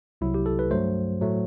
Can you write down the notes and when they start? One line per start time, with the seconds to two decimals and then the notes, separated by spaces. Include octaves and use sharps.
0.21 C2 C3 F#3 E4
0.34 G4
0.46 A4
0.59 B4
0.71 G2 F#3 A3 C5
1.21 A2 F#3 A3